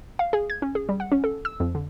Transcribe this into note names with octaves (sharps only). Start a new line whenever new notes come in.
F5
G#4
G#6
C#4
G#4
G3
F#5
C#4
A4
E6
F2
D3